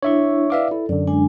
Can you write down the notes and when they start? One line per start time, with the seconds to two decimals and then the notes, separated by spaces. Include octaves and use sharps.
0.03 D4 E4 C#5 E5 C#6
0.50 E4 B4 D5 E5 F5 D6
0.71 E4 A4
0.89 F#2 D3 D5
1.07 G#3 D4 G#5